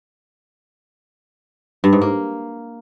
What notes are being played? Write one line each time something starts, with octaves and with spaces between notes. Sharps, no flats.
G2
G#2
A#3